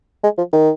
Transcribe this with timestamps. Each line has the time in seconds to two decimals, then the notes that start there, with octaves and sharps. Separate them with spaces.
0.24 G#3
0.38 F3
0.53 D#3